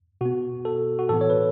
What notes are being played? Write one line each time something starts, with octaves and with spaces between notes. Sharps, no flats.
B2 B3 F#4
A4
F#4
A2 E3 B3 A4
C#5
B4